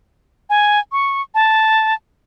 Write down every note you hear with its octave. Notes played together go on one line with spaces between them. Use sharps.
G#5
C#6
A5